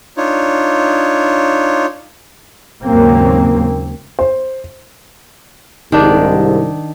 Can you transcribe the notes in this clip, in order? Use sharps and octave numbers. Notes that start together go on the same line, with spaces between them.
D4 D#4 F4 C#5
D#2 G#2 C#3 F#3 A#3 C4
C5
C2 G#2 D#3 D4